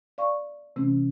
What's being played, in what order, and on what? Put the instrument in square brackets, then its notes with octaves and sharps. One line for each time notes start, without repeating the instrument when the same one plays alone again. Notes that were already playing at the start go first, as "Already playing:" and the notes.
[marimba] D5 F5 C#6
C3 E3 A3 C4 C#4